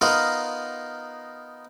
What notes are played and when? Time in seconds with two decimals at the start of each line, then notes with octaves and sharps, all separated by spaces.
0.01 B3 D#4 F4 A#4 D#5 F5